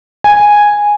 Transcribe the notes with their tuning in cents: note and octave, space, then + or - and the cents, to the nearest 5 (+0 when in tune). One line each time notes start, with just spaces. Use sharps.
G#5 -5